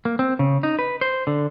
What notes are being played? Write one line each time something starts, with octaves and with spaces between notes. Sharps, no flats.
A#3
C4
C#3
D#4
B4
C5
D3